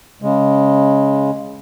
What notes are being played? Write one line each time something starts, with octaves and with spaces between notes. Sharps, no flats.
C#3 G#3